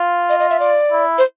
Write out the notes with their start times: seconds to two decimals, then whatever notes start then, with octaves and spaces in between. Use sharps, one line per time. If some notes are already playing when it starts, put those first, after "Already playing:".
Already playing: F4
0.29 D#5
0.39 D#5
0.50 E5
0.60 D5
0.92 E4
1.18 C5